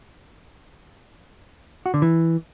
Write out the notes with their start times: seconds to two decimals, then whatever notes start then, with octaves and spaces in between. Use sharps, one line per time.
1.86 F#4
1.94 D3
2.02 E3